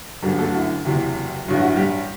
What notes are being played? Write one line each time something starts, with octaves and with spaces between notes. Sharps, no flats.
G1 F#2 D3 G3 G4
A3 A4
F#4
E4
F#1 E2 C3 F#3
A1 G2 F#3
F#4
E4
G3 G4